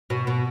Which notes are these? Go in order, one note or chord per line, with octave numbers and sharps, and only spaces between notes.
B2
B2